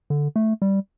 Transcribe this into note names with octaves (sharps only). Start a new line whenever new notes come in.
D3
A3
G3